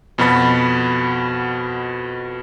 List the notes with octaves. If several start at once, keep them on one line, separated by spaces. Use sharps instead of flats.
F2 B2 F#4 B5 A6